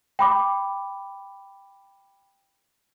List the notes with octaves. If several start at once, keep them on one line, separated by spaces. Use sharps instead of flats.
G5 B5 D6